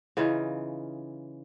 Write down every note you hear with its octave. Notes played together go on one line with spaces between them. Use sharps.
C#3 E3 D#4 F4